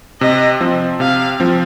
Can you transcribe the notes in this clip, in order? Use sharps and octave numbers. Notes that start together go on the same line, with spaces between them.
C3 D#5
F3 C4
C3 F5
F3 C4